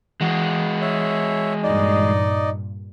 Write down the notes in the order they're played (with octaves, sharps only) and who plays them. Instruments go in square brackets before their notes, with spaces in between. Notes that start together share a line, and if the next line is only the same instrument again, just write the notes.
[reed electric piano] E3 [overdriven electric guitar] G#3 F#4
[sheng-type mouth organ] C#5 E5
[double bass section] G2 A#2 [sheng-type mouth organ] D#4 D5 D#5